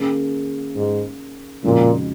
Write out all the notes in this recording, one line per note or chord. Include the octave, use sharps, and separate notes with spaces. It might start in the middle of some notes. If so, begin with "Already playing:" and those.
Already playing: D#3 A#3 C#4 G#4
G#2
F2 A#2 C#3 G#3 D#4 F#4